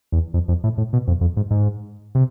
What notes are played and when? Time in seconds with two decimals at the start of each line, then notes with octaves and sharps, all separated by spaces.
0.12 E2
0.34 F2
0.48 F2
0.64 A2
0.78 A2
0.93 B2
1.08 F2
1.21 F2
1.37 G#2
1.51 G#2
2.15 C3